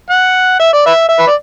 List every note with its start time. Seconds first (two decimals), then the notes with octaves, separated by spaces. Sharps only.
0.10 F#5
0.60 E5
0.74 D5
0.86 B4 E5
1.09 E5
1.19 B4
1.27 D5